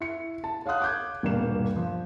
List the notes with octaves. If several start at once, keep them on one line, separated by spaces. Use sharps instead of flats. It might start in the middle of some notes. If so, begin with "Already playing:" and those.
E4 C#7
A5
C#5 F5 F#5 D#6 F#6
D6 G6 G#6
D#1 G2 B2 A#3 E7
F3